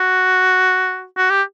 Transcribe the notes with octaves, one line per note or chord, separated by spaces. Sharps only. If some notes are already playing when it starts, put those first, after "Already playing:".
Already playing: F#4
F#4
G4